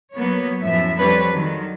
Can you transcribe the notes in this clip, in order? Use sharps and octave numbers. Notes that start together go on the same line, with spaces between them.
F#3 A#3 B3 C#5
F#2 A2 F3 B3 E5
F2 G3 C4 D4 B4 C#5
D3 D#3 F#3